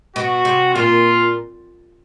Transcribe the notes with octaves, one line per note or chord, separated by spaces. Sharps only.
B2 F#4
C3
A#2 F4